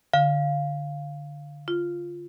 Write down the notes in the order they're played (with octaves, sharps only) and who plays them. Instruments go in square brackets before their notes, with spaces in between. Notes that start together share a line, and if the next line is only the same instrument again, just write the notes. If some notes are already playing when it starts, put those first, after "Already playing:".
[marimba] D3 [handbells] F5
[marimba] F4